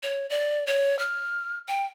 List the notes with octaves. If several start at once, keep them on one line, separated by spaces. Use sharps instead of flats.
C#5
D5
C#5
F6
G5